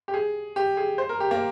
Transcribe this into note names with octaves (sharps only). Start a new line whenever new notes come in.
G4
G#4
G4
G#4
C5
A#4
G4
A#3